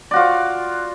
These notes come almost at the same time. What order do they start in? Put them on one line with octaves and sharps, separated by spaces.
D5 F#4 F4